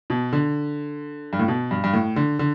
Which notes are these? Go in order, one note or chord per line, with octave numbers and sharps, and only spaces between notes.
B2
D3
G2
A2
B2
G2
G2
A2
D3
D3